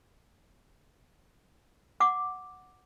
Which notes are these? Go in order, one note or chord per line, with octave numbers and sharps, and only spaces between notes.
F#5 D6